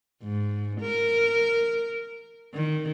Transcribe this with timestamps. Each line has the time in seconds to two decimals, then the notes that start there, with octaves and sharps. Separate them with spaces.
0.23 G#2
0.81 A#4
2.54 D#3